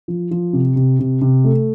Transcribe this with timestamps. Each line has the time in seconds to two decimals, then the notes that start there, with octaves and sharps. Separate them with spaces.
0.08 F3
0.31 F3
0.53 C3
0.76 C3
0.99 C3
1.21 C3
1.44 A3